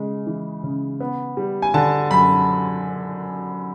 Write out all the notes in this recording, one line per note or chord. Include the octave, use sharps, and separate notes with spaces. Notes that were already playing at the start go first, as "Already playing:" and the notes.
Already playing: C#3 G#3
E3
C#3
B3
G3
G#5
D3 A5
F#2 B5